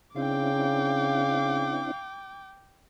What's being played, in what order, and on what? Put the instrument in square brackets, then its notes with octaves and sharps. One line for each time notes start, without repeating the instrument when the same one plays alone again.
[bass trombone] C#3 [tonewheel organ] C4 D4 E4 [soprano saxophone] F5 [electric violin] G5 D6